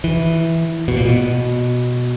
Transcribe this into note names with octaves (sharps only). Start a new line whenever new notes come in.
E3
B2
A#2
B2